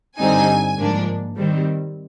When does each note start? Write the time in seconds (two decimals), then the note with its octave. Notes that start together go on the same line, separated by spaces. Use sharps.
0.18 G2 D3 G3 C4 D#4 G#5
0.77 G#2 F3 A#3 D4
1.36 D#3 G3 C4